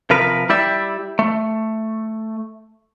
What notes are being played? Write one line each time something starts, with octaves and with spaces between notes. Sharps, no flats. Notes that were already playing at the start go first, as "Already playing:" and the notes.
C3 F3 A#4 B4
G3 E4 G4 D5 E5
A3